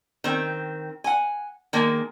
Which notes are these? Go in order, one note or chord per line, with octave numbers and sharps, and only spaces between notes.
D#3 C4
F#5 G#5
D#3 G#3 A#3